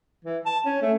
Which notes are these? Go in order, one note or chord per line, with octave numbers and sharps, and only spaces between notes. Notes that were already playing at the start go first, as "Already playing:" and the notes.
E3
A5
C#4
A3